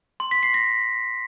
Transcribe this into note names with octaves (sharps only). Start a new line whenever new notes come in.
C6
B6
C7
A#6